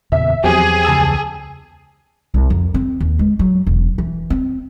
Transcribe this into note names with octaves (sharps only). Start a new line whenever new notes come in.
E2 A#2 C#3 E5
E2 F3 F#3 C4 G4 G#4
C#2 A5 E6
C2
F2
C4
D#2
G#3
F#3
E1
E3
C4